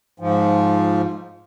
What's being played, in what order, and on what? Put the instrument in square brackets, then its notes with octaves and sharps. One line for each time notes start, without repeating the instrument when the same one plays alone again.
[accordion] G#2 F3